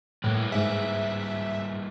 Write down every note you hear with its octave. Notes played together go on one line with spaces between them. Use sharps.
A2 G3 A#3 B4
G#2 G#4 E5